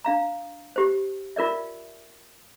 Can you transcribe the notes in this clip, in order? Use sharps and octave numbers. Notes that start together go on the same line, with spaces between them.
D4 F5 A#5
G4 C5
F4 A#4 D5 E5